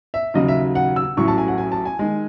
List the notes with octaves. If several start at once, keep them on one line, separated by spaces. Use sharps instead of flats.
E5
D#2 C#3 F#3 D#5
E5
F#5
E6
A1 A2 F#3 C#6
A5
G#5
F#5
G#5
A5
G#5
D#3 G#3